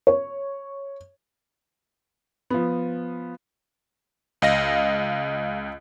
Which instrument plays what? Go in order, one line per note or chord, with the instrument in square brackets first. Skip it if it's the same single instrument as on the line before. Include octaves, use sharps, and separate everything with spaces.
[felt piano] C#5
F3 B3
[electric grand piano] C#2 D#5 F5 A#6